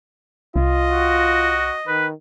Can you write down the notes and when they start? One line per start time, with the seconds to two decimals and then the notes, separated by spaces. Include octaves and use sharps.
0.56 C2 F4 D#5
0.91 F#4
1.87 D#3 B4